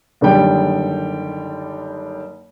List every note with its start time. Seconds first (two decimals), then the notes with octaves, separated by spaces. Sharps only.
0.21 F#1 D3 D#3 G3 G5